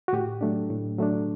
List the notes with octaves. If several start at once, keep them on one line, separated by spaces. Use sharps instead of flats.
F#4
A2 G4
F#3 A3 D4
A2
F#3 A3 D4